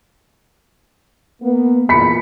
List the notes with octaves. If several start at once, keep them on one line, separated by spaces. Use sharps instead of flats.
A#3 B3
E2 A#2 B5 B6 C#7